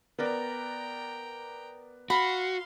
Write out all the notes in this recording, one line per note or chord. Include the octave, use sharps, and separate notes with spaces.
B3 A#4 D5 G5 A#5
F#4 F5 B5 C6